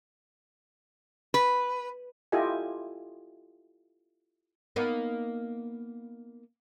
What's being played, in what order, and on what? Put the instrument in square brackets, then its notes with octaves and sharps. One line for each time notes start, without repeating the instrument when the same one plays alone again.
[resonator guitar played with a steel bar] B4
[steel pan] E4 F4 G4 A4 D#5 G#5
[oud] A#3 B3 D#4